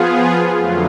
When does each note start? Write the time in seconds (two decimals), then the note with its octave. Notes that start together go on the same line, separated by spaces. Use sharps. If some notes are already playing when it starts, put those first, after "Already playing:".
Already playing: F3 B3 F4 G#4
0.56 F2 D3 F#3 A3 F4